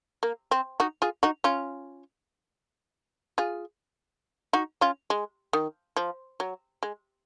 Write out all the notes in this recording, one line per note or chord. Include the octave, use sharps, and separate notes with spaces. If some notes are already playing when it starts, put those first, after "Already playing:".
A#3
C4
D#4 F#4
F4 G#4
D#4 F#4
C#4 F4
F4 G#4
D#4 F#4
C#4 F4
G#3
D#3
F3
F#3
G#3